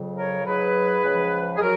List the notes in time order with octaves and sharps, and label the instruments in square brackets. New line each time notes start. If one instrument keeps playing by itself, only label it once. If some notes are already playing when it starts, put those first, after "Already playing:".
Already playing: [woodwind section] F2 C#3 F#3
A#4 C#5
G#2 F#3 G#4 B4
C#2 C#3 F3
G#4
F#3 F#4 A#4